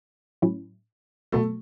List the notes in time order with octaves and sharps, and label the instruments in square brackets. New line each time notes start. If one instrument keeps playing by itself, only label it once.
[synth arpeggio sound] A2 F#3 C#4 E4
[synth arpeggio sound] B2 F#3 B3 F#4 [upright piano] A3